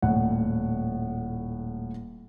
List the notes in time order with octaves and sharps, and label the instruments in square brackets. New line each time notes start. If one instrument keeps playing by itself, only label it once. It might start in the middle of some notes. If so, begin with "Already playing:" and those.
[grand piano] D#1 A2 F#5